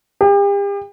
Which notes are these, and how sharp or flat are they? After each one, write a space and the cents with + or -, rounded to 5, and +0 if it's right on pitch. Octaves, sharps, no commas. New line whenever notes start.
G4 +40